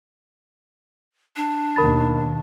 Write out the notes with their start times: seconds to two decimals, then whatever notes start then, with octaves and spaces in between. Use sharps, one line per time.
1.36 D4
1.76 D#2 B2 A#4 B5 A6